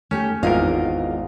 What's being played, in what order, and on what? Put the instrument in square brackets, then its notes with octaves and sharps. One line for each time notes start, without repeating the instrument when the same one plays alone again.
[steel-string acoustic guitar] A3 G4 [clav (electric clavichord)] C#4
[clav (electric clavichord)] G#1 E2 A#4 [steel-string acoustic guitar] F4 D#5 F5